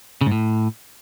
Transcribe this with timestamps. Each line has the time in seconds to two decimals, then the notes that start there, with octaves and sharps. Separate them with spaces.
0.21 C#3
0.26 G#2
0.32 A2